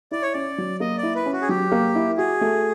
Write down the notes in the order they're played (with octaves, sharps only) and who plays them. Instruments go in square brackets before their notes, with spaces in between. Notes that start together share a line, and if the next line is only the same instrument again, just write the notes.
[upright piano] E4 [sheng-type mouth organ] D5
[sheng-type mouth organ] C#5
[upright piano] C#4 [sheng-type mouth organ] D5
[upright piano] F#3
[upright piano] A#3 [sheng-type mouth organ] D#5
[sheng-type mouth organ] D5
[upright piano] E4
[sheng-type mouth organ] B4
[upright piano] C#4
[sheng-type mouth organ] F#4
G#4
[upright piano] F#3 [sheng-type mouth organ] G4
[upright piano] A#3
E4
[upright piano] F#4 [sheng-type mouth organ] G#4
[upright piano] A3